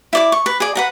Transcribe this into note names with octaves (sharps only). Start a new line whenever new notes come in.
E4 D5 D6
C#6
B4
G#4 D5
B4 F#5 A#5